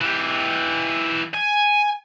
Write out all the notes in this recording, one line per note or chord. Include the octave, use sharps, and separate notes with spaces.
E3 G4
G#5